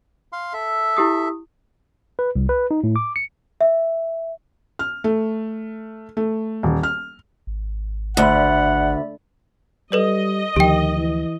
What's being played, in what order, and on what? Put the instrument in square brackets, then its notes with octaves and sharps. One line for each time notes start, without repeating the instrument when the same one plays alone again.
[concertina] F5 C6
A4 E5
[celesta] E4 G4 D#6
[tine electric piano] B4
C2
B4
D#4
A2
D6
C#7
[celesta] E5
[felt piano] F6
A3
A3
D#1
F6
[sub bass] G#1
[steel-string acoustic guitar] D2 [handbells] D5 E5 B5 [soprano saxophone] F#5
[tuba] G3 [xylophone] A4 B4 D5 [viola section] D#5
[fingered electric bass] D2 F3 [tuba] D#3 [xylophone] G4 G5
[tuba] E3